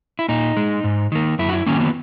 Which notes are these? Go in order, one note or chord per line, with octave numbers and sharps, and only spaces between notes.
E4
A#2 D#4
G#3
G#2
D#3 A#3
F#2 E4
F#4
E4
D#3 F#3 A#3 C#4
B3